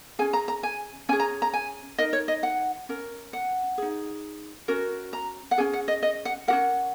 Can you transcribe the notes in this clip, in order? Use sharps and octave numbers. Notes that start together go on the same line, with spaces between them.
C#4 G#4 G#5
A#5
A#5
G#5
C#4 G#4 G#5
A#5
A#5
G#5
D#4 A#4 D#5
C#5
D#5
F#5
C#4 A#4
F#5
D#4 G#4
C#4 F#4 A#4
A#5
F#5
C#4 G#4 G#5
F#5
D#5
D#5
F#5
F#4 A#4 F#5
C#4